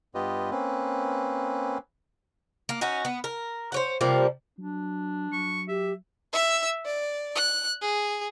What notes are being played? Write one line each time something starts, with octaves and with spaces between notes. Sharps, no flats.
G2 B3 F4 G4 B4 D#5
A#3 C4 C#4 B4
A#3
C#4 D#4 F#4
B3
A#4
C5 C#5 F#5
C3 F3 G3 A#3
F#3 D4
F#3 C#6
G4 E5
E5 E6
D5
F#6
G#4